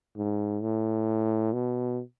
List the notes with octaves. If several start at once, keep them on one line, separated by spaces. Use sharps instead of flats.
G#2
A2
B2